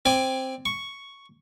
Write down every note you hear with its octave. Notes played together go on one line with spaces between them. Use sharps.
C4 D5 G#5
C#6